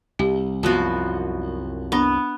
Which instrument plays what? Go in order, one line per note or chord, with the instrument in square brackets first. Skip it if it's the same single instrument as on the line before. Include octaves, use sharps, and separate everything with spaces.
[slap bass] C2 [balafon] G4
[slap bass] C2 F#2 [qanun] F3 B3 F#4
[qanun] B3 [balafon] D4 C#6